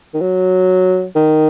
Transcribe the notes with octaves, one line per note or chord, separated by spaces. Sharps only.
D#3
F#3
D#3